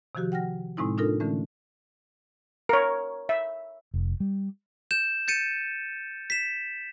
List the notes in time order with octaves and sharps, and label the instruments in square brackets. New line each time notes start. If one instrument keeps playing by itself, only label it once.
[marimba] C3 D#3 F3 F#4 G4
F#5 G5 F6 A#6
A2 C3 G#3 C4 D#4 E4
D4 D#4 F4 A4 A#4
D3 E3 A3 C#4
[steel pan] A#4 C#5
E5
[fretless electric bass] F1
G3
[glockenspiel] G6 E7
G6 A6 C#7 D#7
B6 E7